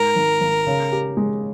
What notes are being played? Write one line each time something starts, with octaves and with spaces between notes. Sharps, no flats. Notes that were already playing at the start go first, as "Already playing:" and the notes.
Already playing: G#2 A#4
G#1
G#1
C#3
G4
G#3